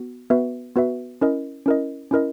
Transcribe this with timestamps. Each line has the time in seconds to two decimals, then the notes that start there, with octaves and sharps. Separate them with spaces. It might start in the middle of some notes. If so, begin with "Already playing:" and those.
Already playing: B3 F#4
0.30 B3 F#4 B4 E5
0.76 B3 F#4 B4 E5
1.21 C#4 E4 A#4 D#5
1.66 C#4 E4 A#4 D#5
2.11 C#4 E4 A#4 D#5